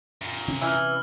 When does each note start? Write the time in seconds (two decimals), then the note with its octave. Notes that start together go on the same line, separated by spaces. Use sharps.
0.21 F#2 A#2
0.48 C3 C#4
0.61 E3 E6 F6